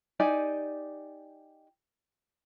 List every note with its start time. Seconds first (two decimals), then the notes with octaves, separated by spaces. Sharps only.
0.20 D#4 G4 D5 G#5